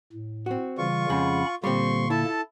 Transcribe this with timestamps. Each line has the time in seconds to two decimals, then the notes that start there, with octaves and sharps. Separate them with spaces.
0.13 A2
0.46 C4 F#4
0.78 C#3 E3 G3 F4 C#6
1.10 F2 C#3 G#3 C#4 F#5 B5
1.64 A#2 D3 G3 A#3 C4 C6 C#6
2.10 E4 A4 A5